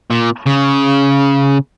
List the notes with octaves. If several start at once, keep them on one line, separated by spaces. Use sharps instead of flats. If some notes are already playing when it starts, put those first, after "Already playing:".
A#2
C#3